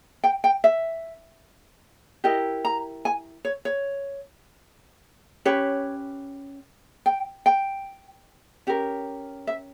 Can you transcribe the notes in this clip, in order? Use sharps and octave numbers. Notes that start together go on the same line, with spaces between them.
G5
G5
E5
E4 G4 A#4 D#5
A#5
G#5
C#5
C#5
C#4 G4 B4 C#5
G5
G5
C#4 G4 A#4
E5